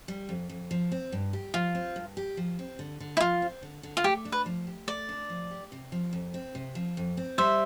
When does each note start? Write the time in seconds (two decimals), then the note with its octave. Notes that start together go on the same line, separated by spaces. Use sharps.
0.08 G3
0.29 F2
0.49 F2
0.71 F3
0.92 C4
1.12 G2
1.33 G4
1.54 F3 F4
1.75 C4
1.96 G2
2.17 G4
2.37 F3
2.59 C4
2.79 D3
3.00 D3
3.17 E4
3.21 F3 F4
3.42 C4
3.63 D3
3.83 D3
3.97 F4
4.04 A3 G4
4.25 D4
4.32 B4
4.46 F3
4.67 G4
4.87 A3 D5
5.09 D4
5.30 F3
5.51 G4
5.72 C3
5.92 F3
6.13 F2
6.34 C4
6.55 C3
6.75 F3
6.97 F2
7.17 C4
7.38 G3 C5 E5